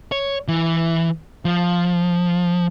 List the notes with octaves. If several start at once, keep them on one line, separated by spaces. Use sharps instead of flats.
C#5
E3
F3